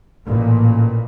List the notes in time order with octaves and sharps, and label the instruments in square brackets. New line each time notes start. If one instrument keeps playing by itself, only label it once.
[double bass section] A1 A#2